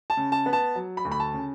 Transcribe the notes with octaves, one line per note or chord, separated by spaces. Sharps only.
A5
C#3
A5
B3
A5
F#3
B5
D2
B5
A5
C#3